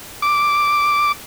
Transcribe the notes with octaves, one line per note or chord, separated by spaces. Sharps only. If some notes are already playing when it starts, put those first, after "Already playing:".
D6